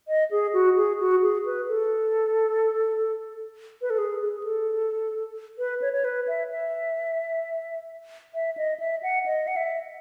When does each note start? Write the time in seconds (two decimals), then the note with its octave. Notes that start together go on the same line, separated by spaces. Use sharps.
0.08 D#5
0.31 G#4
0.53 F#4
0.77 G#4
1.00 F#4
1.22 G#4
1.46 B4
1.68 A4
3.82 B4
3.90 A4
3.98 G#4
4.21 G#4
4.43 A4
5.59 B4
5.82 C#5
5.93 C#5
6.04 B4
6.28 E5
6.50 E5
8.34 E5
8.58 D#5
8.80 E5
9.03 F#5
9.26 D#5
9.47 F#5
9.56 E5